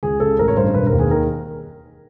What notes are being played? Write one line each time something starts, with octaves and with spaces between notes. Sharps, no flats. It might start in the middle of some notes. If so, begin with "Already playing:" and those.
C#2 G#4
C#3 A4
A1 A#4
C#5
G2 C5
E1 B4
A#4
D#2
G#4
D#3 A#4